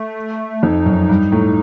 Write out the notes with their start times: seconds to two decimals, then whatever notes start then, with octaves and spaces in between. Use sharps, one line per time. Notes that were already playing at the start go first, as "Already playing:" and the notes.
Already playing: A3
0.63 F2 D#4
0.86 F#2
1.09 G2
1.32 A2